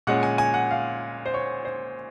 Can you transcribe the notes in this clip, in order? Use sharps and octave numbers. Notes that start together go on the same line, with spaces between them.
A#2 G#3 C#4 F#5
G#5
G#5
F#5
F5
C5
C#5
C5